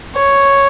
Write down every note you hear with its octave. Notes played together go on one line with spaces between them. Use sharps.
C#5